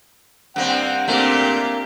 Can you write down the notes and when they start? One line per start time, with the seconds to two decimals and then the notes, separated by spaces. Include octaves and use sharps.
0.56 G2 A#3 C4 F#5
1.08 A#2 A3 A#3 C4 D4 G4